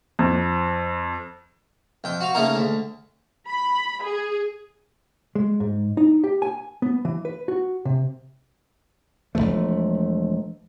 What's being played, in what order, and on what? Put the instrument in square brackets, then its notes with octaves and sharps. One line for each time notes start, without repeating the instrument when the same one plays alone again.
[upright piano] F2
[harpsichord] F2 G5
F#4 F5
C#3 A3 A#3 D#4 A#4
D2
[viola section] B5
G#4
[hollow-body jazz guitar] G#3
G#2
D#4
G4
G#5
B3
E3
B4
F#4
C3
[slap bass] E1 F#2 F3 A3